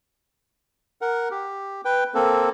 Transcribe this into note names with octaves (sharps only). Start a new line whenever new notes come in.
A#4 F#5
G4
B4 G5
A#3 C4 A4